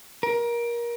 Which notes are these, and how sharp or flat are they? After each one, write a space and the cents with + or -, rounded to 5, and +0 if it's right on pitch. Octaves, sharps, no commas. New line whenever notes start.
A#4 +25